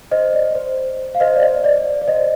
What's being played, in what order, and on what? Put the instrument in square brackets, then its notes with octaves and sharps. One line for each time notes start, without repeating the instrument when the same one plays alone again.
[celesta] C5 D#5
D5
C5
F5
C5 D#5
D5
C5 D#5
D5
D5
C5 D#5